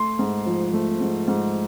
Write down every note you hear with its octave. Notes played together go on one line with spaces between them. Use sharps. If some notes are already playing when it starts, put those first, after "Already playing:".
Already playing: A3 C6
G#2
F3
A3
G#2
G#2